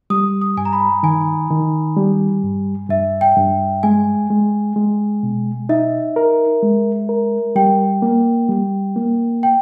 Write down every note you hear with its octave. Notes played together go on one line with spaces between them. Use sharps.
G3 D#6
D#6
G2 G#5
A#5
B5
D#3 G#5
D#3
G3
G2
G2 E5
G5
G2
G#3 G#5
G#3
G#3
B2
D#4 E5
A#4
G#3
A#4
G3 G5
A#3
G3
A#3
G5